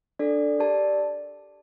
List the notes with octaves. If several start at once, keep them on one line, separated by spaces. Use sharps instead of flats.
D4 A4 D5
G4 A#4 D5 A5